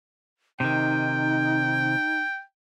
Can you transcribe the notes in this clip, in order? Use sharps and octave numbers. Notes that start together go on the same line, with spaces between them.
C3 D#3 D#4 G5